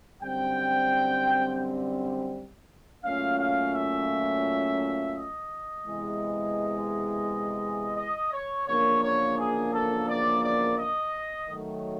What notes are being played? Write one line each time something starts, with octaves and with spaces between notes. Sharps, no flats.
F#2 D3 G3 C4 G5
A#2 F#3 A3 C#4 F4 F5
F5
E5
D#5
E2 C3 E3 G#3
D#5
C#5
E2 C#3 F3 A#3 D4 C#5
C#5
G#4
A4
D5
D5
D#5
D#3 F#3 A3